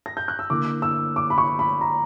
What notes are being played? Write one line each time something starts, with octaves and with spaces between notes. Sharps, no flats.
A#6
G6
F#6
E6
D3 A#3 E4 D6
E6
D6
B5
C#6
B5
A#5